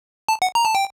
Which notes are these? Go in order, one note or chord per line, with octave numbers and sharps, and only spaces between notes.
A5
F#5
A#5
A5
G5